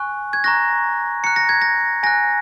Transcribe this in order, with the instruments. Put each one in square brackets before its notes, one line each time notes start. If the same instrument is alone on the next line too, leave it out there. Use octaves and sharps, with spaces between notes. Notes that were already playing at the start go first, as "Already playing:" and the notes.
Already playing: [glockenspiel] G#5 C#6 F#6
G#6
A#5 C#6 F#6 A#6
A#5 F#6 C#7
A#6
G#6
A#6
G#5 F#6 A#6